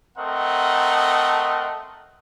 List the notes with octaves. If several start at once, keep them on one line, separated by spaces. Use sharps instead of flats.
A3 C4 A#4 D#5 F#5